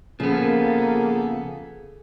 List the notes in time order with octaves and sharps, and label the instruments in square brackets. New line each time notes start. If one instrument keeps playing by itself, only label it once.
[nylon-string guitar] C#3 [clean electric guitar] F3 B3 [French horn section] A#3 [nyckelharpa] G#4 A4